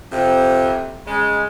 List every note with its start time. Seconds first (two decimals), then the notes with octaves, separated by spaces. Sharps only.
0.12 F2 C3
1.07 C#3 G#3